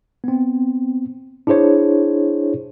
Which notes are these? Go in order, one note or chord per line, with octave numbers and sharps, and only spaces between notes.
B3 C4
D4 E4 G#4 C5 C#5